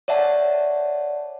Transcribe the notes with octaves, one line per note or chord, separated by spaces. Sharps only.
C#5 D5 E5 F#5 A5